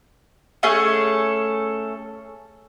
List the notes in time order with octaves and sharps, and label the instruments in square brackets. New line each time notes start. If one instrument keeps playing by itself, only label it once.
[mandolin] A3 C#4 G#4 A4